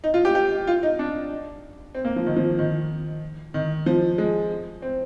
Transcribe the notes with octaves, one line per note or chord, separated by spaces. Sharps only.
D#4
F4
G4
G4
F4
D#4
D4
C4
A#3
F3
D#3
F3
D#3
D#3
F3
G#3
C4